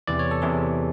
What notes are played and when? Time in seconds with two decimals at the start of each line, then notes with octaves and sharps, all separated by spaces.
0.07 E2 C3 E3 D5
0.19 C#5
0.31 A4
0.42 E2 C3 E3 G#4